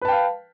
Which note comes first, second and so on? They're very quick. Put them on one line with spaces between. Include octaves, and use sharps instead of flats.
B4 A5 G5 F5